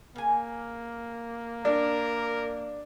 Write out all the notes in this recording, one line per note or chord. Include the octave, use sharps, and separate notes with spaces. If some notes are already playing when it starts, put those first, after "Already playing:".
C#3 A#3 G#5
D4 A#4